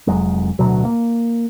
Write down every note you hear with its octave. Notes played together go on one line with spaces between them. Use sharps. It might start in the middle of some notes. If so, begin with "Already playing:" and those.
F1 F2 F#3 G#3
D1 D2 B2 F#3
A#3